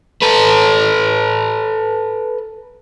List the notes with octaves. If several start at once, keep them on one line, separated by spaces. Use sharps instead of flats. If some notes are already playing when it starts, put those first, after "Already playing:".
A4 B4